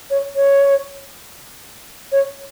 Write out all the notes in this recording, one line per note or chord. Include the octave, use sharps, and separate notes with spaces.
C#5
C#5
C#5